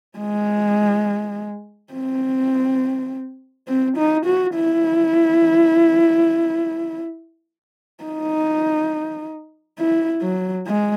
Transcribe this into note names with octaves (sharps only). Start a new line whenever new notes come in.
G#3
C4
C4
D#4
F#4
E4
D#4
E4
F#3
G#3